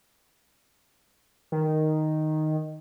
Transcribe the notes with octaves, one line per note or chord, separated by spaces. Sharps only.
D#3